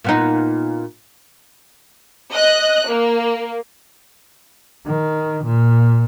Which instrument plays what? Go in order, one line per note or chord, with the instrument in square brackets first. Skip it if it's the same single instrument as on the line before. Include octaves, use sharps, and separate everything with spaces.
[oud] A#2 B3 D#4
[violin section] D#5 F#6
A#3
[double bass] D#3
A#2